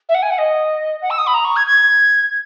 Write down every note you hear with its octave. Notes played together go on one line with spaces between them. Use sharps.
E5
F#5
G#5
F#5
D#5
F#5
E6
D#6
B5
A#5
C#6
G#6
G#6